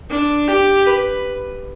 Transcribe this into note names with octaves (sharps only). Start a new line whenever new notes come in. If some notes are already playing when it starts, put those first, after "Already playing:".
D4
G4
B4